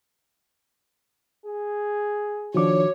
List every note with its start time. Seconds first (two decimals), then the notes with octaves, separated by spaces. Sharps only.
1.45 G#4
2.54 D#3 F3 D4 F#4 C#5 D6